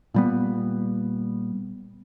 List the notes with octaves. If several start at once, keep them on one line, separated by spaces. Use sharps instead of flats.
A#2 G3 B3